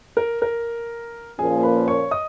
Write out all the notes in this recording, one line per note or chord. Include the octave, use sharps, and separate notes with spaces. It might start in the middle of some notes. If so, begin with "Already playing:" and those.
A#4
A#4
A#2 F3 A#3 C#4 G#4 G#5
B4 B5
C#5 C#6
D#5 D#6